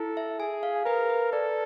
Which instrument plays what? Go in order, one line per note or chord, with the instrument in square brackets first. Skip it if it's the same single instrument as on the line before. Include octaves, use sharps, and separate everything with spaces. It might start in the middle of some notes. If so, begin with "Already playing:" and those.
Already playing: [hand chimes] E4 [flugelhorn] A4
[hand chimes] E5
[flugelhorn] G#4 [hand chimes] G#5
[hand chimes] F5
[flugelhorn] A#4 [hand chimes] B4
[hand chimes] B4
[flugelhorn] A4 [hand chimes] D5